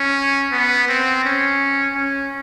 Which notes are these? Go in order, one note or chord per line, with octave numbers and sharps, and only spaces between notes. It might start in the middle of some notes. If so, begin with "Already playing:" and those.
Already playing: C#4
B3
C4
C#4
C#4